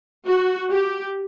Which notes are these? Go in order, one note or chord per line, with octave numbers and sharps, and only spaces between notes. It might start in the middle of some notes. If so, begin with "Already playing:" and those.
F#4
G4